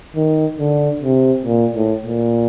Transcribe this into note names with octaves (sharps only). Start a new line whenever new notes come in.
D#3
D3
C3
A#2
A2
A#2